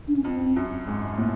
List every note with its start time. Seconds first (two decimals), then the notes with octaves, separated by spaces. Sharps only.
0.08 D4
0.16 C#4
0.24 F2 C4
0.56 F#2
0.87 G#2
1.18 A2 A#3